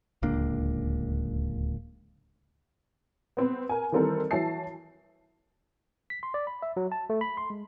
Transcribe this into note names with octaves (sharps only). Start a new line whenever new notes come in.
D1 C#2 A#3 D4
B3 C4 B4
A#4 G#5
D#3 E3 G3 C4 A4 A#4
E3 F#3 C#5 E5 A5 C7
B6
C6
D5
B5
E5
F#3
A5
A3
B5
C6
G#3